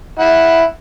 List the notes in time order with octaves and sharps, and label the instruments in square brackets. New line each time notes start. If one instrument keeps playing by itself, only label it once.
[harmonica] E4 F#5